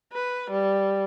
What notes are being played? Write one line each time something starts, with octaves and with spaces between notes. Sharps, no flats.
B4
G3